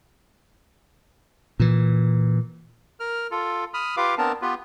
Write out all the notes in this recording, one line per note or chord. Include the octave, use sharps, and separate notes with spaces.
A#2 E3
A#4 F6
F4 A4
B5 D#6 F6
F4 G4 B4 F5 D6
B3 C4 D4 A#4 A5
B3 F4 G4 B4